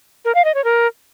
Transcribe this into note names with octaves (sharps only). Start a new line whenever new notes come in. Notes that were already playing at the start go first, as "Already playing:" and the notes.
A#4
F5
D#5
C#5
A#4